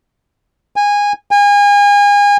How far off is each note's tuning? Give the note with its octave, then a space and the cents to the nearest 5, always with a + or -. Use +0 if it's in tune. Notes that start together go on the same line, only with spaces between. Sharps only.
G#5 -20
G#5 -35